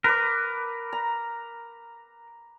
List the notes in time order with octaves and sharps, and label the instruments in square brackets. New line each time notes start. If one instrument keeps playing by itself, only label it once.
[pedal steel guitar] A#4 [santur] B4 D6
[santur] A#5